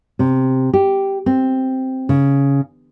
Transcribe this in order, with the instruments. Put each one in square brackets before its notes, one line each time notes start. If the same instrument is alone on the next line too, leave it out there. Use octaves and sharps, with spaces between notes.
[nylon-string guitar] C3
G4
C4
C#3